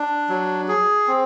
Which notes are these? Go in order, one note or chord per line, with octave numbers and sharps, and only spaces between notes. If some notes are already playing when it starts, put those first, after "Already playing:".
Already playing: D4
F#3
G#4
C4